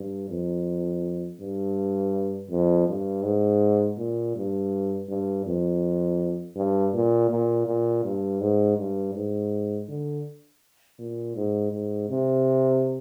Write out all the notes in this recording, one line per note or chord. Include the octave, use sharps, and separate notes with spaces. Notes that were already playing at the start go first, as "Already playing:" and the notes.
Already playing: G2
F2
G2
F2
G2
G#2
A#2
G2
G2
F2
G2
A#2
A#2
A#2
G2
G#2
G2
G#2
D3
A#2
G#2
G#2
C3